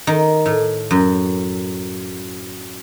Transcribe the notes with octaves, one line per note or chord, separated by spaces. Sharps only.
D#3
A2
F#2